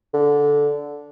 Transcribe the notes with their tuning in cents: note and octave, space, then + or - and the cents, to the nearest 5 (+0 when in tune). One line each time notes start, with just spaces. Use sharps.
D3 -10